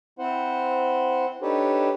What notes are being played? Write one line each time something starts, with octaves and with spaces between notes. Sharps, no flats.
C4 E4 C5 F#5
D4 D#4 G4 A4 B4 C#5